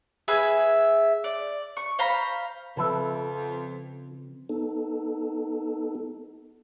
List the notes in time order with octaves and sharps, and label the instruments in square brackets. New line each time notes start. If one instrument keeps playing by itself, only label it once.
[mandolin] G#4 B4 E5 G#5
D5
C#6
C5 F5 A#5 B5
[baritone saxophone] F2 [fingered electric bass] C#3 F3 C4 [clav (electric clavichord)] A4 B4 E5
[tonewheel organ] B3 D#4 A4